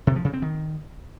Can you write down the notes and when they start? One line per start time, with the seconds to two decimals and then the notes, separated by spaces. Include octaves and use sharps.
0.07 C3
0.16 F3
0.25 C#3
0.33 C4
0.42 D#3